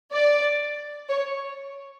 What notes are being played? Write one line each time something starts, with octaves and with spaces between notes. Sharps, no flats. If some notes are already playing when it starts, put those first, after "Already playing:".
D5
C#5